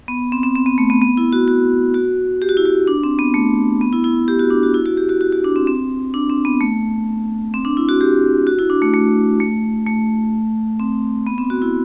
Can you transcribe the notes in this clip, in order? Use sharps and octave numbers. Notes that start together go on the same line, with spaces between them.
B3
C4
C4
C4
B3
A3
B3
B3
E4
F#4
F#4
F#4
G4
F#4
E4
F#4
D4
C4
B3
A3
B3
E4
E4
G4
F#4
D4
F#4
E4
F#4
G4
F#4
F#4
F#4
D4
C4
C4
D4
C4
B3
A3
C4
D4
E4
F#4
G4
F#4
E4
D4
A3
A3
A3
A3
C4
B3
C4
F#4
E4